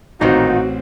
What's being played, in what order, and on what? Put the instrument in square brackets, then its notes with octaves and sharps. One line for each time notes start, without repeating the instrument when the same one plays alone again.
[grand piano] A1 C4 C5 [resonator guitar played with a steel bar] A#2 D#3 [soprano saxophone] D#4 [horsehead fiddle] F#4